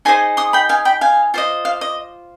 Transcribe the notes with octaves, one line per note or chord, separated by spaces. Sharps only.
D#4 G#4 C5 D#5 G#5 C6
C6 D#6
G5 B5
F5 G#5
G5 B5
F5 G#5
F4 C5 D#5
F5
D#5